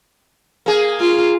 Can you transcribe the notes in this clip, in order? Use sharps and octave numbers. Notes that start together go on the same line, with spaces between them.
A#3 G#4
F4